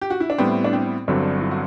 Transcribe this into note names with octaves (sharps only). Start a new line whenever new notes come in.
G4
F#4
E4
D4
A2 G3 B3 C4 E4
D4
C4
G1 G2 D3 F#3 C4 D4
E4
F#4